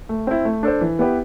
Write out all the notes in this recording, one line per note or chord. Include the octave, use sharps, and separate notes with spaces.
A3
C4 E4
A3
D4 A4 C5
E3
B3 E4 G4 B4